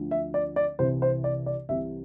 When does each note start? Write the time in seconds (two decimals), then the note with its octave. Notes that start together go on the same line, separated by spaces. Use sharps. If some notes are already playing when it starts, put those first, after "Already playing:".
Already playing: D2 D3 F3
0.11 E5
0.34 D5
0.56 D5
0.79 C2 C3 E3 C5
1.02 C5
1.24 D5
1.46 D5
1.69 C2 C3 E3 E5